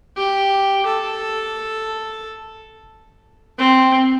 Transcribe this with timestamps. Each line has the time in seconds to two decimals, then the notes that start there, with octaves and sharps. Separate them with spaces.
0.17 G4
0.86 A4
3.59 C4